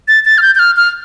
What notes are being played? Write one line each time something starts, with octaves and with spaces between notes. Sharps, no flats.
A6
A6
F6
G6
G6
F6
F6